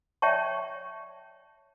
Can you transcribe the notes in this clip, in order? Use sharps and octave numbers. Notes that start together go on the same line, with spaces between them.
C#5 D5 E5 G5 A5 C#6